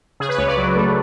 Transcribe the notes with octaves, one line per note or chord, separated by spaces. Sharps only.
C#3 G#4
B4
C#2 C#5
D5
F#3
A3